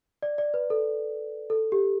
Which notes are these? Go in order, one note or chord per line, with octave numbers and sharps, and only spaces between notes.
D5
D5
B4
A4
A4
G4